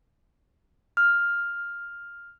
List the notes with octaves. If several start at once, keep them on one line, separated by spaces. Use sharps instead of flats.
F6